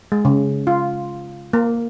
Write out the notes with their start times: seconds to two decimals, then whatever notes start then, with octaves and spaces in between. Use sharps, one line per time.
0.12 G#3
0.25 C#3
0.67 F4
1.53 A#3